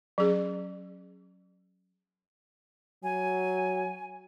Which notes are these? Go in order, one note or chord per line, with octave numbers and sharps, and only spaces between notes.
F#3 C#4 G#4
F#3 G#5